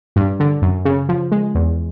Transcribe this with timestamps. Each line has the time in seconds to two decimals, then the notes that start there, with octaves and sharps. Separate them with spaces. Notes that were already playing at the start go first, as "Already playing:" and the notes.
0.16 G2
0.40 D3
0.62 F#2
0.85 C#3
1.09 F3
1.31 G#3
1.55 E2